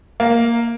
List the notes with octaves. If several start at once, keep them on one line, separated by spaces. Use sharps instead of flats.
A#3